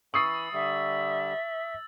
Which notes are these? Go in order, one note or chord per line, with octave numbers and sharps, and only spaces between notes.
E3 B5 C#6 D#6 E6 A6 C7
D3 G3 E5